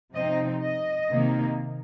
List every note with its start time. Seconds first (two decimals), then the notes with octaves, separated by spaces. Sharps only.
0.14 C3 F3 C4 D#4 D#5
0.62 D#5
1.10 C3 D#3 A#3 D#4